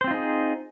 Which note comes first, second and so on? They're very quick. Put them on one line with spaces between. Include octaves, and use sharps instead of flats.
C5 C4 F4 D#4 G#4